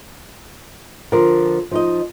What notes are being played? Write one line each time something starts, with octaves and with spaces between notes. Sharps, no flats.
D3 F3 A#4
F3 D#4 D#5